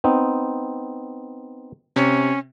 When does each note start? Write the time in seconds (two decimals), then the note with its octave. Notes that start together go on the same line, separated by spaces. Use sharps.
0.04 B3 C4 D#4
1.96 C3 C#4